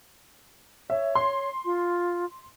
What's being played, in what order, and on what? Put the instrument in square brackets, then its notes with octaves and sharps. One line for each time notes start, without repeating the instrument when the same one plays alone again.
[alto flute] C#5 [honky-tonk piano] E5
[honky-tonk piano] C6
[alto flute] F4